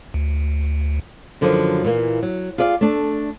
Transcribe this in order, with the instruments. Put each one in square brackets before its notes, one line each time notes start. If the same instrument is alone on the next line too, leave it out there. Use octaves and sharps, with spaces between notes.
[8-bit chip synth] D2
[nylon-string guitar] F#2 D3 D#3 F3 F#3
A#2 E3 A#3
F#3
F4 G#4 D5 E5 F5
A3 D4